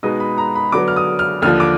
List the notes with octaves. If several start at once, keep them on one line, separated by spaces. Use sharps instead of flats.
B2 G#3 B3 D#4 D#6
B5
A#5
B5
D3 F#3 B3 D6
F6
D#6
F6
D#2 D3 F3 F6
D6